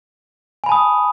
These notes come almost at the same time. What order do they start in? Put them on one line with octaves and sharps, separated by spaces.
G#5 B5 A5 D#6